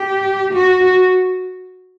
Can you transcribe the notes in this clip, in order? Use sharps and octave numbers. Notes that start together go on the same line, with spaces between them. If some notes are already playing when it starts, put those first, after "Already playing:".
Already playing: G4
F#4